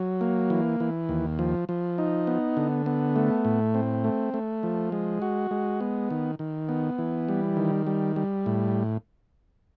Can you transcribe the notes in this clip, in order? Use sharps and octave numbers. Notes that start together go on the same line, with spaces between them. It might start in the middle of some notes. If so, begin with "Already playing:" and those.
Already playing: F#3
A#3
E3
E3
D#2
F3
F3
D#4
B3
D3
B3
A3
A2
C4
A3
A3
F3
G#3
F#4
G#3
B3
D#3
D#3
B3
E3
G3
D#3
G3
G3
A2